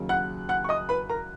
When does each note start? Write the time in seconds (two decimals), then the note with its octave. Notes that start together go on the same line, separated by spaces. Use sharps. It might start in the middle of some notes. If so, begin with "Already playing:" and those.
Already playing: D#2 C#3 F#3
0.09 F#5 F#6
0.49 F#5 F#6
0.64 C#6
0.69 D#5 D#6
0.89 B4 B5
1.10 A#4 A#5